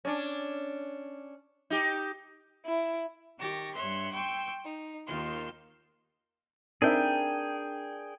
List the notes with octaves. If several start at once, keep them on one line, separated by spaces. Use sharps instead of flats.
C#4 D4
D#4 G4
E4
D#3 G4 C#6 A6 A#6
G2 C#5 E5 C6 F#6
G5 C6 C#6 E6 G6
D#4
D#2 D#3 F4 C6 G6
C4 D4 D#4 G#4 A#4 E5 G5